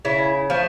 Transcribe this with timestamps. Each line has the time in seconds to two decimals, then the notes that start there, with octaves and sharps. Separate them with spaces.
0.05 C#3 E4
0.50 F3 A3